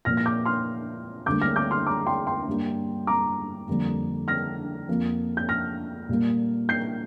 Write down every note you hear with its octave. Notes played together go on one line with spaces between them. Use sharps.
A#2 F3 A#3 F6 A#6
A#6
D6 G6
C6 F6
D2 D3 G3 A#3 D6 G6
F6 A#6
D6 G6
C6 F6
A#5 D6
G5 C6
G5 C6
G2 G3 A#3
A#5 D6
F2 D3 G3 A#3
F6 A#6
F2 F3 A#3
G6
F6 A#6
A#2 G3 A#3
G6 C7